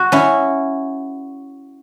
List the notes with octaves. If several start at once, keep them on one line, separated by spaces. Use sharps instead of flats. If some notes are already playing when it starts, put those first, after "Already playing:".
Already playing: F#4
C#4 E4